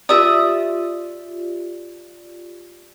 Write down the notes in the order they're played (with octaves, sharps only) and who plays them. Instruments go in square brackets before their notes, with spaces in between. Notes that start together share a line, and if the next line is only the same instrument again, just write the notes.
[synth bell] F4 G4 D5 [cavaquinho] E5 D#6